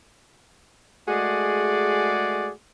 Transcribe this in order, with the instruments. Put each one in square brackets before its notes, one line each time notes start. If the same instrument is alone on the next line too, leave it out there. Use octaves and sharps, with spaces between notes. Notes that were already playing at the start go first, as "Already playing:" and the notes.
[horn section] G#3 A3 F#4 G#4 D5